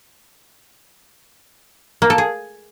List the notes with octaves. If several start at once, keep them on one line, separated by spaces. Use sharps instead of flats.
A#3
A4
G#4